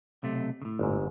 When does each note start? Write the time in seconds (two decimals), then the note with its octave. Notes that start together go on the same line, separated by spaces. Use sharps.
0.23 B1 C3 A3
0.62 A2 C#3
0.79 G1 G#2